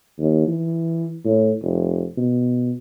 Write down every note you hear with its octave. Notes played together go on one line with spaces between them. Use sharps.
D#2
E3
A2
F1
B2